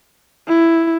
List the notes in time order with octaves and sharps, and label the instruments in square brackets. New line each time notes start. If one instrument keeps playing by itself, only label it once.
[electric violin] E4